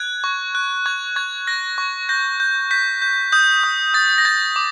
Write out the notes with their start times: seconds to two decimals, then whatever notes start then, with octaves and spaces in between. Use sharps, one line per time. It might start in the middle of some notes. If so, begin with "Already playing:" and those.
Already playing: F#6 G#6
0.24 C#6
0.55 F#6
0.86 C#6 G#6
1.16 C#6 G#6
1.47 F#6 A#6
1.78 C#6
2.09 G6 A#6
2.40 G6
2.71 G6 B6
3.02 G6
3.32 D#6 G6
3.64 D#6
3.94 D#6 A6
4.18 A#6
4.25 G6 A6
4.56 D6